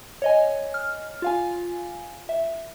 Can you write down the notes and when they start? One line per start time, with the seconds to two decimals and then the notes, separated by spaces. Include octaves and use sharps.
0.22 C#5 D#5 G#5
0.74 F6
1.22 F4 F5 G#5
2.29 E5